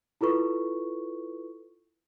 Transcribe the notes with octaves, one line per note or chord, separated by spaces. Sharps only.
E4 F4 A4 B4 C#6